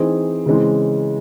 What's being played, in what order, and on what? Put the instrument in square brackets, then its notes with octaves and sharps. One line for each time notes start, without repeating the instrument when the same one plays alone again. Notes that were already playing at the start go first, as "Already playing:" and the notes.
Already playing: [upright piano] E3 C4 D#4 G#4
C#3 E3 G#3 C4